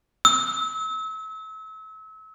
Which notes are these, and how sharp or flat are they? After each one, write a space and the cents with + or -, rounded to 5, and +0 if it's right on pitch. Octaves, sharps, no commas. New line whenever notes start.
E6 -35